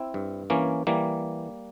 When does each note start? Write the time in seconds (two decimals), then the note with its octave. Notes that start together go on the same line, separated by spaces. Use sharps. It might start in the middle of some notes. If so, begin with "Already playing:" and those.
Already playing: C4 E4
0.14 G2
0.50 E3 A#3 C#4
0.87 E3 G3 A#3